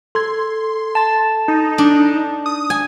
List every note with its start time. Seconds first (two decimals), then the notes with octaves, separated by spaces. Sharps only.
0.15 A4 C6 G#6
0.95 A5 A6
1.48 D#4
1.78 D4
2.46 D#6
2.70 G#5